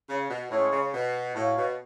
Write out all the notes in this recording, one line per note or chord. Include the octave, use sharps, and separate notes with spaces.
C#3
B2
A2 G#3 C#4 G#4 C#5
C#3
B2
A2 F#4 C#5 F5
B2